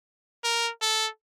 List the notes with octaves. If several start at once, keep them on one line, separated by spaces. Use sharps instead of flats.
A#4
A4